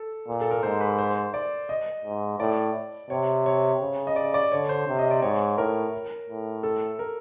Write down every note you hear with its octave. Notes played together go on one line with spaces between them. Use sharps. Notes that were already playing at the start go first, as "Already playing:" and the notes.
Already playing: A4
A#2
A4
A#4
G#2 C5
B4
C5
D5
D#5
G#2
A2 D5
C3 C#5
C#5
C#3
D#5
D5
D5
D3 C#5
C5
C3
D#5
D5
G#2 C#5
A2 A#4
A2
A4
A#4